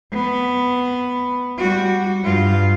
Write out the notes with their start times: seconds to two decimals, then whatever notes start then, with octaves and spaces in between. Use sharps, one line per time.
0.13 B3
1.58 G3 F#4
2.23 G2 F4